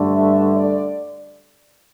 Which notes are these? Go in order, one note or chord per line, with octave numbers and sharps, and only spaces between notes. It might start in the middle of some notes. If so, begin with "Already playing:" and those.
Already playing: G2 D3 A3 D4
E5
D5